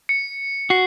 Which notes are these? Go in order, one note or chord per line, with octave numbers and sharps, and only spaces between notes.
C#7
F#4 C7